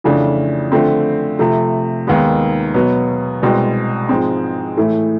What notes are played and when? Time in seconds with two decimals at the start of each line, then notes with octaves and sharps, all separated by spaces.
0.04 F2 C#3 E3 A3 D4
0.72 D3 F3 A3 C4
1.39 C3 F3 A3
2.07 D#2 D#3 G#3 B3
2.74 B2 F#3 B3
3.42 C2 B2 G#3 C4
4.09 G#2 F3 G#3 C4
4.77 A2 E3 A3